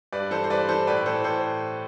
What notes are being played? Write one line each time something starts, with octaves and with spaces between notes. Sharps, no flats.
G2 B4 D5
E3 A4 C5
C5
G2 B4 D5
E3 A4 C5
A2 B4 D5
E3 A4 C5
A2 A4 C5